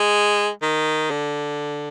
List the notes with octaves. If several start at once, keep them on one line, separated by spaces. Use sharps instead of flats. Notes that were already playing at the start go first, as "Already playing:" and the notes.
Already playing: G#3
D#3
D3